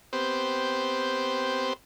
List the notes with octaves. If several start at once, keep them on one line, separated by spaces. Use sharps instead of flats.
B3 C4 G4 C5